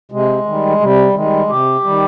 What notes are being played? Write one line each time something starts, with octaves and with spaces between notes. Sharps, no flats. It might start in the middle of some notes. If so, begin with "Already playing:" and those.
C3 G#3
D#3 G3
C3 G3
D#3 G3 G#3
C3 G4
D#3 G3